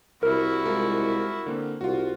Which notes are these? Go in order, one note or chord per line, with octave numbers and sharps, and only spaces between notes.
C2 E4 F#4 A#4
G#3 F4 A#4
D3 A#3 C4
C2 F4 F#4